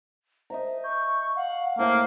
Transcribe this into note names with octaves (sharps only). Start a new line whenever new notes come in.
C5 D#5 E5 A#5
C#6 G6
F5 F#5
A2 A#3 A4 C5